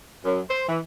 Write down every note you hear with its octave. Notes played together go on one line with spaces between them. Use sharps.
F#2
C5
E3